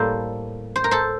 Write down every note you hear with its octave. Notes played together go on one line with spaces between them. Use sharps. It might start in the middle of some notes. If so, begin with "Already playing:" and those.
Already playing: A2 G3 A#3 A4 C5
C5
A#4
A4 C5